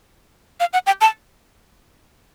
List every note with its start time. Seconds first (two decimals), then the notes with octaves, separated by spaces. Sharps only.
0.60 F5
0.73 F#5
0.87 G5
1.01 A5